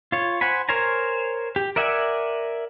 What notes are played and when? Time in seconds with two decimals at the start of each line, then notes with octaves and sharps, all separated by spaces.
0.12 F4 C#5
0.41 C5 F#5 G#5 B5
0.69 A#4 C5 C#5 G#5 A#5
1.56 G4
1.76 A#4 D5 E5 F#5 G#5